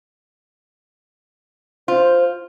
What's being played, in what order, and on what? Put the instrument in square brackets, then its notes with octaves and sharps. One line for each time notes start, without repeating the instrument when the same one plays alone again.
[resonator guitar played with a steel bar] F4 [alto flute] C5